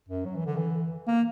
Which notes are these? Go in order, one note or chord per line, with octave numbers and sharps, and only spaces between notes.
F#2
F#3
E3
D3
E3
A#3